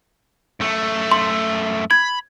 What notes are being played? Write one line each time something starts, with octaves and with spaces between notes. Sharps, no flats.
F#2 A3
C6
B5 G#6